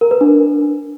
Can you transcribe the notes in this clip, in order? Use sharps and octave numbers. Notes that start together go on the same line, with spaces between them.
A#4
B4
D4